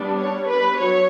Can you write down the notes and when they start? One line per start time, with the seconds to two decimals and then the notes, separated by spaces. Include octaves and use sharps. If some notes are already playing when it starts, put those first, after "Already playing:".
Already playing: G3 B3 D4
0.18 C#5
0.48 B4
0.79 F#3 C#5